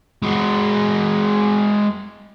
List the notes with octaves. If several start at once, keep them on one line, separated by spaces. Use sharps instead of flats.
G#3 F#4